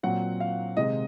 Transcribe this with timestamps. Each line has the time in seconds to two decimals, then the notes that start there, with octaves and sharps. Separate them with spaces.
0.03 A#2 F#3 C4 F#5
0.40 F5
0.77 C3 D#3 G#3 C4 D#4 D#5